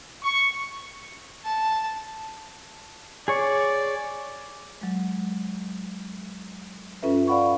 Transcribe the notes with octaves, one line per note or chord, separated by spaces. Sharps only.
C#6
A5
G#4 C#5 D5 C#6
F#3 G#3
G2 C#4 F4 A4 B4 E5
D5 F5 F#5 B5 C#6